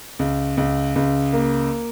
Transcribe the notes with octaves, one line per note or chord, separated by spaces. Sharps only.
C#2
C#2
C#2
A#3